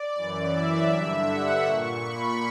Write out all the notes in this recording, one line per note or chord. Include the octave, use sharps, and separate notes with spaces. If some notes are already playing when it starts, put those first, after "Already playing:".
Already playing: D5
F#2 E3
E5
G2 D3
F#5
A#2 C#6
B5